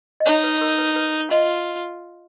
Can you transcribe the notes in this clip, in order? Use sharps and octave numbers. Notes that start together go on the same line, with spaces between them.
D#5
D#4 C#5
B4
A#4
B4
B4
F4 D#5